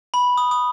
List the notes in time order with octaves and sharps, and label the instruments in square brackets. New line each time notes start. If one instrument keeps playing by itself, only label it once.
[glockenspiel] B5
D#6
D#6